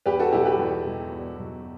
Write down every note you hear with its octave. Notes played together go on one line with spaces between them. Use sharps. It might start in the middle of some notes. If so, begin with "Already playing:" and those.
E2 G4 B4
F#4 A4
B2 F#3 E4 G4
G4 B4
E2
B2 F#3
E2
B2 F#3